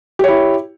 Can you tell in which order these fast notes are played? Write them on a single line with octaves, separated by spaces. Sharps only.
G4 C#5 E4